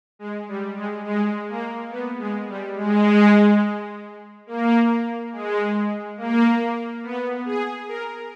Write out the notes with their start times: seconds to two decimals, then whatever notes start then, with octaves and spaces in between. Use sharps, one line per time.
0.19 G#3
0.48 G3
0.76 G#3
1.05 G#3
1.48 A#3
1.90 B3
2.19 G#3
2.48 G3
2.76 G#3
4.47 A#3
5.32 G#3
6.18 A#3
7.03 B3
7.45 G#4
7.88 A#4